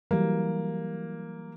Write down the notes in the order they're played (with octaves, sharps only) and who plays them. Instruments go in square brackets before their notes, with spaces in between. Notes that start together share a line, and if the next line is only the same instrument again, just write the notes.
[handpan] E3 F#3 G3 [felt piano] A#3